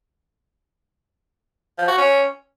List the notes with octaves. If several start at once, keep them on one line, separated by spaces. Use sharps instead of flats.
F3
F#4
C#4